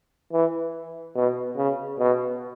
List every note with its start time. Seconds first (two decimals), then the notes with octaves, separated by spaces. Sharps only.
0.33 E3
1.15 B2
1.57 C#3
1.99 B2